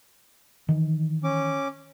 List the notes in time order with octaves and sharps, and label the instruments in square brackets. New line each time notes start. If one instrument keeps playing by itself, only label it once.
[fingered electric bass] D#3 E3
[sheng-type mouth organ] C#4 D6